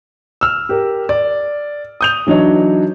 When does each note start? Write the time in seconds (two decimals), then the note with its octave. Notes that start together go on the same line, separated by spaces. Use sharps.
0.41 E6 F6
0.69 G4 A#4
1.09 D5
2.01 D#6 G6 F7
2.27 E3 F#3 D4 D#4 C#5